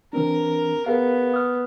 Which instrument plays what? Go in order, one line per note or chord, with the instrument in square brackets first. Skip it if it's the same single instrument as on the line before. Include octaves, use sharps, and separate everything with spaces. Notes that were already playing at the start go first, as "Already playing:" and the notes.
[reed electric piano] E3 C4 D4 [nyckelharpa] A#4
[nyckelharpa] B3 [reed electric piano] G#4 A#4 F5
[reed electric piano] D#6 F6